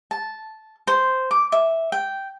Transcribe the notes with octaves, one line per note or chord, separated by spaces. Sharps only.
A5
C5
D6
E5
G5